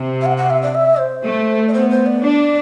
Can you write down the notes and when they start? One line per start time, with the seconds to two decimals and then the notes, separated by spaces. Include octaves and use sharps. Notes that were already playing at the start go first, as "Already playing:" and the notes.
Already playing: C3
0.21 E5
0.26 F#5
0.37 F#5
0.50 E5
0.63 D5
0.75 E5
0.99 C5
1.24 A3
1.68 D5
1.73 B3 C5
1.90 C5
2.06 D5
2.23 D4